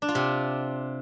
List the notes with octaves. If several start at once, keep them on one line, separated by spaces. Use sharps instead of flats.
D4
F4
C3